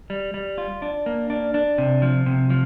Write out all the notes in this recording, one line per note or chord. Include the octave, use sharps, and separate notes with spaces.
G3
G3
F4
D4
A#3
D4
D4
C3
F3
C3
F3